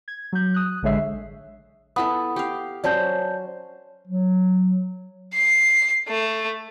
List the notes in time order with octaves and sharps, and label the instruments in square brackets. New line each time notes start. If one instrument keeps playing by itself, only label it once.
[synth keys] G#6
F#3 G6
D#6 F#6
A1 D3 G#3 C#5 E5 C7
[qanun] B3 E4 A4 [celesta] F#5 B5 D#6
[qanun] G4 F5
[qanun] F#3 C#4 C5 [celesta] D5 A5 G6
[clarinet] F#3
[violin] C7
A3